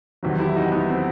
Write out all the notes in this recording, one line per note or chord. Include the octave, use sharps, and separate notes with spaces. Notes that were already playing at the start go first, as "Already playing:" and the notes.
E2 C3 D#3 F#3
E4 G4
D#4 F#4
B3 D#4
C4